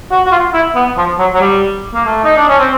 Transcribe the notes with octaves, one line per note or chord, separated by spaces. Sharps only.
F#4
F#4
F4
E4
B3
F3
F#3
F#3
G3
A#3
A3
D#4
D4
C#4
C4